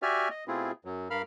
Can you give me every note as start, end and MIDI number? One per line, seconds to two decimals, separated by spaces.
0.02 0.29 66
0.02 0.29 67
0.02 0.29 74
0.02 0.29 76
0.02 0.29 80
0.02 0.29 89
0.30 0.44 75
0.48 0.72 47
0.48 0.72 57
0.48 0.72 60
0.48 0.72 64
0.48 0.72 65
0.48 0.72 68
0.85 1.08 42
0.85 1.08 54
1.10 1.22 43
1.10 1.22 70
1.10 1.22 77
1.10 1.22 83
1.10 1.22 89